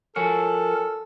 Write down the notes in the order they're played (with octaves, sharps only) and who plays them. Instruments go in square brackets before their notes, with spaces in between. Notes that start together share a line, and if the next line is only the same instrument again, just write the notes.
[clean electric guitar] F3 F#4 C#5 [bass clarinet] A4 [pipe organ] A#4 [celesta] G#5